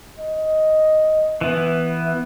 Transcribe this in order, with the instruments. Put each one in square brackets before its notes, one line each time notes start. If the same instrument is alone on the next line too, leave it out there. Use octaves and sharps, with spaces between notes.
[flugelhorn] D#5
[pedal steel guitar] E3 B3 [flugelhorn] E5